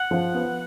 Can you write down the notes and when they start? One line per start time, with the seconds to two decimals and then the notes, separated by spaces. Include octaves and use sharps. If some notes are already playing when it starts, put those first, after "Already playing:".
Already playing: F#5
0.11 F3
0.34 B3